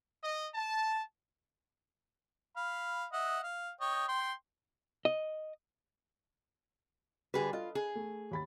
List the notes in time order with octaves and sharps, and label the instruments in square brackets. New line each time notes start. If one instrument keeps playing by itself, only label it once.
[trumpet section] D#5
A5
[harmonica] F5 B5
D#5 E5 F#5
F5
C#5 D#5 G5
G5 C6
[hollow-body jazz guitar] D#5
[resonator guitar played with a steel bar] D3 G#4 B4 [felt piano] G3 F#4
[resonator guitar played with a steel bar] F4 [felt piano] A4 D#5
[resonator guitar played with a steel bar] G#4
[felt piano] A3
D#2 B5 A6